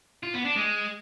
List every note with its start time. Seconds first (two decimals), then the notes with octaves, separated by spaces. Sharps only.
0.23 F4
0.34 B3
0.45 D4
0.56 G#3